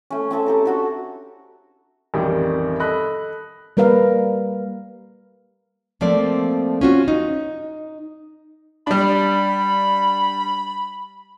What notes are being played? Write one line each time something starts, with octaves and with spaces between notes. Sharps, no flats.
A3 C#4
C4 C#4 A4 E5
G4 A4 A#5
D4 F#4 A4
A1 F2 D#3 G3 G4
A4 D#5 B5 F#6
G3 A#3 A#4 B4 F5
F3 A3 A#3 C4 D5
C#4 F4 F#4
D#4
G3 D4 B5